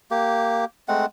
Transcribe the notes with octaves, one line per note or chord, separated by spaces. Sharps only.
A#3 G4
G#3 A3 C4 F#5